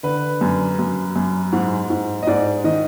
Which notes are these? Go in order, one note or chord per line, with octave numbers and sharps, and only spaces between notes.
D3 B4
F#2
F#2
F#2
G#2
G#2
D#5
G#2 D5
D#3 D#5